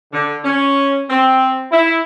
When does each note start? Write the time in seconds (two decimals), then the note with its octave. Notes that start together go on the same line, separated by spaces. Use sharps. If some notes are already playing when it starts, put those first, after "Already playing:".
0.12 D3
0.44 C#4
1.09 C4
1.72 E4